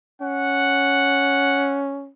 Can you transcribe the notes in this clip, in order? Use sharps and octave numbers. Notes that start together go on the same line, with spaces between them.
C#4 F#5